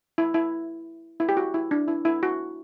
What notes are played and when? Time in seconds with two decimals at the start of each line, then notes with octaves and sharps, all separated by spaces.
0.18 E4
0.34 E4
1.20 E4
1.29 G4
1.37 F#4
1.54 E4
1.71 D4
1.88 E4
2.05 E4
2.23 F#4